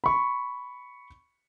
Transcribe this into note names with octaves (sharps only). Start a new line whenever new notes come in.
B5 C#6